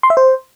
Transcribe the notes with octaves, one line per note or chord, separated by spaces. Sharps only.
C6
E5
C5